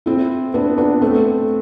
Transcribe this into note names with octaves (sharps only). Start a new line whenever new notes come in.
C4 E4
B3 D4
B3 D4
A3 C4